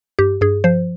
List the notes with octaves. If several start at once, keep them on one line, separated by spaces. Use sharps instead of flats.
G2 G4
G2 G#4
F3 C5